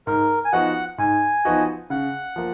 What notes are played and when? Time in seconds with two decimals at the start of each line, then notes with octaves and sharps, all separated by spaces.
0.07 G#2 A#4
0.45 G#5
0.52 F3 B3 D#4 F#4 F#5
0.98 G#2 G#5
1.45 F3 B3 D#4 F#4
1.90 C#3 F#5
2.36 F3 A#3